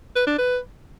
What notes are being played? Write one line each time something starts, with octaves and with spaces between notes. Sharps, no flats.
B4
D4
B4